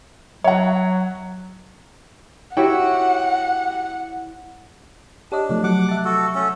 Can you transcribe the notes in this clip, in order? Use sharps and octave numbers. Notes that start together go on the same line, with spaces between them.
F#3 C#5 F#5
E4 F#4 G4 C#5 F#5 G5
D4 G4 C#5 D#5
C3 F3 A3
F#3 F#5 D6
E5 A5
F#4 A4
A3 C#4 A4